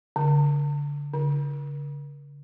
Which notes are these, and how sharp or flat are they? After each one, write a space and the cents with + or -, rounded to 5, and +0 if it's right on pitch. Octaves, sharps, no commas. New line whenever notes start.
D3 -25
D3 -45